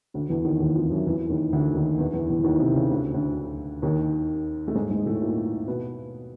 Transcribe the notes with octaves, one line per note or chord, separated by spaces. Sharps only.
D2 D3
E2 E3
D#2 D#3
D#2 D#3
F2 F3
F#2 F#3
E2 E3
D#2 D#3
D2 D3
D#2 D#3
E2 E3
E2 E3
E2 E3
E3
D#2 D#3
C3
C#3
D2 D3
D2 D3
D#2 D#3
A3
G#2 G#3
G#2 G#3
A2 A3
A#2 A#3
B2 B3